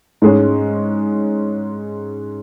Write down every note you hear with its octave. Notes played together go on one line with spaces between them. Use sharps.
G#2 G#3 C#4